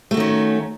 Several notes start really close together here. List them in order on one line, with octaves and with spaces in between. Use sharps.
A3 F#4 D#3 C#4